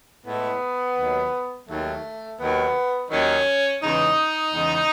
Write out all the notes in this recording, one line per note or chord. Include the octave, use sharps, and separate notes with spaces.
A2 G#3 B3
D#2 D#3 F#3
D#2 D#3 F#3 A3
D#2 D#3 F#3 B3
D#2 D#3 F#3 C#4
E2 C#3 G#3 D#4
E2 C#3 G#3